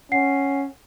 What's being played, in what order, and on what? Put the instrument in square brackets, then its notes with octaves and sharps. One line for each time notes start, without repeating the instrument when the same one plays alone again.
[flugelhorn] C#4 [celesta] F#5 C7